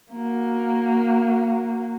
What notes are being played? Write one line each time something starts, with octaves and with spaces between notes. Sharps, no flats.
A#3 F#4